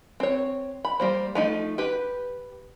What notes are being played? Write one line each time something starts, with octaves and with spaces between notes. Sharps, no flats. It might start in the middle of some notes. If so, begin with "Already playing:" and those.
C4 C#5
B5
G3 A#3 C5
F3 A3 D#4
G4 B4